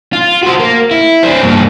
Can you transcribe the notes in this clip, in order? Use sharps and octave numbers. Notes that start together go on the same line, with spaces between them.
F4
F#4 C5
A#3
E4
C4 D4
G2 A#3